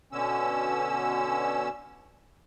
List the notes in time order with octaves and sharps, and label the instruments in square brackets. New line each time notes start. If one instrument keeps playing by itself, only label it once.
[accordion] B2 D3 C#4 E6